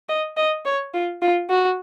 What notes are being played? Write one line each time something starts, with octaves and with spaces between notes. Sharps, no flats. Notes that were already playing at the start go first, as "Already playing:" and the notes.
D#5
D#5
C#5
F4
F4
F#4